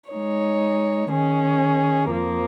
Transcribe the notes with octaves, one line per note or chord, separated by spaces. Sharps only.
G#3 D#4 C#5
D#3 C#4 G#4
F2 F3 A#3